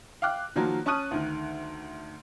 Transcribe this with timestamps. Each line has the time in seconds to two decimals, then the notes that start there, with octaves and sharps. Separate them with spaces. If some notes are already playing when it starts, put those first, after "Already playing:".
0.22 F5 G5 D6 F#6
0.56 D#3 F3 F#3 A#3
0.86 C#4 A5 C#6 D#6 F#6 D#7
1.11 D2 D#3